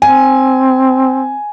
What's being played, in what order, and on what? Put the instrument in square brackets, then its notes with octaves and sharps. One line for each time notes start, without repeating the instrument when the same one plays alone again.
[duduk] C4 [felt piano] G#5